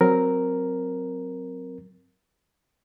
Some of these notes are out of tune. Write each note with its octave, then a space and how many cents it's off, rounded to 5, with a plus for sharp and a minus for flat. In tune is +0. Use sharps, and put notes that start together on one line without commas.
F#3 -5 C4 +0 A#4 +0